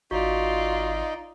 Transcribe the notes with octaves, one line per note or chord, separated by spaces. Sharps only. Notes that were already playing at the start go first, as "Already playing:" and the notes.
G#1 D#4 F4 F#4 D5